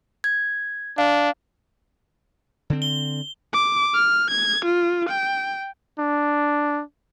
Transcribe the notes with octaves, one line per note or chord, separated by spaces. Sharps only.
G#6
D4 F5
D3 C4
G7
D6
F6
G#6
F4
G5
D4